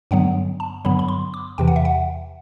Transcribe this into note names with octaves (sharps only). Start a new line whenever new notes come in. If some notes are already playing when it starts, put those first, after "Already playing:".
G2 D3 F#3 B3 F#5
A5
G2 D3 F#3 B3 B5
B5
C6
D6
E2 C3 E3 G5
F#5
E5
F#5